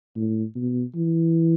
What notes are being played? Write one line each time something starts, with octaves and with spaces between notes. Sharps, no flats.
A2
B2
E3